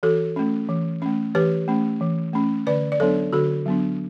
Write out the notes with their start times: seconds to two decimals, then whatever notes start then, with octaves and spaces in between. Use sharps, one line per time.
0.03 E3 F#4 A4
0.36 A3 C#4
0.69 E3
1.02 A3 C#4
1.35 E3 G4 B4
1.68 A3 C#4
2.01 E3
2.33 A3 C#4
2.67 D3 B4 D5
2.92 D5
3.00 F#3 B3 D4 A4 C#5
3.33 D3 F#4 A4
3.66 F#3 B3 D4